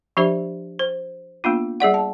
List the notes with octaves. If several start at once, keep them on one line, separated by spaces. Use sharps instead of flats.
F3 D4 G4 C5 E5
C5
A#3 B3 D4 F4
G3 G#4 D5 F#5
A5